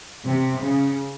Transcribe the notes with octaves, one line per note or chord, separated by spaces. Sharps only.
C3
C#3